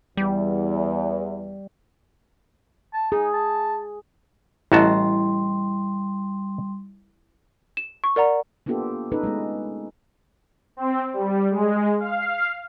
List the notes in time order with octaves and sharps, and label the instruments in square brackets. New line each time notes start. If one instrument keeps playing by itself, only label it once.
[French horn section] E2 [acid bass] G3
[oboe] A5
[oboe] D#4 [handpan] G#4
[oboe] A5
[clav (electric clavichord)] A1 F#4 A5 [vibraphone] G3 C6 [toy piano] E4 D#5
[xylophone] E7
C#6
A#4 D5 F#5 A#5
[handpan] A#3 B3 D4 F4 G4 A4
C#4 D#4 A4 B4
G#3 A3 B3
[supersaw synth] C4
G3
G#3
F5